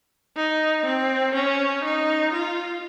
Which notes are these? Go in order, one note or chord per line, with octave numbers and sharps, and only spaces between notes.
D#4
C4
C#4
D#4
F4